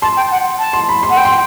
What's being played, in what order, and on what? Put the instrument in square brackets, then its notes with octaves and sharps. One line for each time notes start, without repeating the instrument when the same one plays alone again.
[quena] A5 [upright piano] C6
[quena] G5
F#5
A5
[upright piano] C6
B5
C6
[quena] F#5
G5
[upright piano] C6